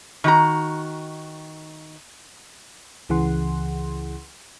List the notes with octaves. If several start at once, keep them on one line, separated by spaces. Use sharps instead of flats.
D#3 F#4 A#5
C#2 C#3 E3 G#4 F#5 C6